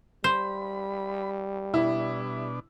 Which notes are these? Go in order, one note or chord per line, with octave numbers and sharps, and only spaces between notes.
G3 C5 B5
B2 D4 E4